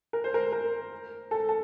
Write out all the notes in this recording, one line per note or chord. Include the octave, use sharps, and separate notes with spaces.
A#4
C5
A#4
A#4
A4
A4